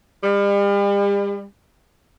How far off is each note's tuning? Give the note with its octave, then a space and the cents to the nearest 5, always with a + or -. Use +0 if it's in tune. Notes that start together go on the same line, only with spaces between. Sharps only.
G3 +40